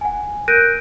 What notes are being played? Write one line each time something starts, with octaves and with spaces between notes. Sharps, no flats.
F#5 G#5
A#4 F#6 G6 A#6 D7 D#7